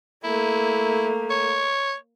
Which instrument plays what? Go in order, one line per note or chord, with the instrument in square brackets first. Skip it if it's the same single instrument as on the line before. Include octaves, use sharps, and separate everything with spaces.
[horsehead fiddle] A3 A#3 [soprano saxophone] E4
[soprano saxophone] C#5